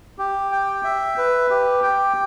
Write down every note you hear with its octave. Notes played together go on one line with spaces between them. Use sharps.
G4
G5
E5
B4
G4
G5